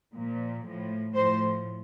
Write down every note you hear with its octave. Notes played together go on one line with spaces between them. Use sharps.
A#2 F3
A2 F3
A2 F3 C5